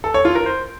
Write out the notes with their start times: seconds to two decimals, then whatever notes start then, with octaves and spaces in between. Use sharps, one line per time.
0.04 A4
0.14 C#5
0.25 F4
0.35 A#4
0.46 C5